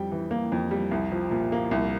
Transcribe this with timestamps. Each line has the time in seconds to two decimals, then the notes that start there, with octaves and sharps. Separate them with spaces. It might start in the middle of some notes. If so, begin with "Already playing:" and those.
Already playing: F2 G3 G5
0.12 E3
0.31 A#3
0.52 F2
0.71 G3
0.91 C2
1.12 F3
1.31 A#2
1.52 A#3
1.71 C2